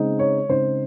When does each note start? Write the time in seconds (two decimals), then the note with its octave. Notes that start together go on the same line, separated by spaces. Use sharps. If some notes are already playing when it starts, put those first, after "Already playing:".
Already playing: C#3 G#3 C4 D#4
0.19 C#5
0.49 C#3 G#3 C4 D#4 C5